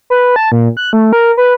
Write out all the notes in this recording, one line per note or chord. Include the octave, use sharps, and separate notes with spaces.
B4
A5
A#2
F#6
A3
A#4
B4